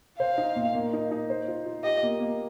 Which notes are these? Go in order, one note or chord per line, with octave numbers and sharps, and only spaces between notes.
C5 F5
D#4
A#2
A#3
D#4
D#4
C5
F4
F4
G4 D#5
A#3
A#3